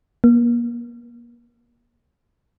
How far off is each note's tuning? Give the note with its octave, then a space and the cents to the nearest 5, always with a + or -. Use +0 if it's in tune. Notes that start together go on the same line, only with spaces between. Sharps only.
A#3 +30